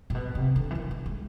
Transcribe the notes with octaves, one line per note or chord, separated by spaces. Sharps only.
A#2
B2
C3
D3
E3
D#3
D3
G#3